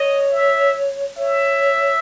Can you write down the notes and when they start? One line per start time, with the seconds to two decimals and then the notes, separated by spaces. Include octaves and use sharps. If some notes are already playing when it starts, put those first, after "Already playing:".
Already playing: C#5 D#5
0.32 E5
1.17 C#5 E5